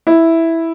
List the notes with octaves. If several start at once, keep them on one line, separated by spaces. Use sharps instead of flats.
E4